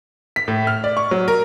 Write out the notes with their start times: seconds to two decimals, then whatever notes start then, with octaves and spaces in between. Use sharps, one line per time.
0.36 B6
0.48 A2
0.67 F6
0.84 D5
0.97 C#6
1.11 F#3
1.28 A#4